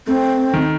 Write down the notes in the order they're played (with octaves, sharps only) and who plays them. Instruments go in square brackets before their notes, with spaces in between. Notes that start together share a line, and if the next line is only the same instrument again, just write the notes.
[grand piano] A3 [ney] C4
[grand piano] D#3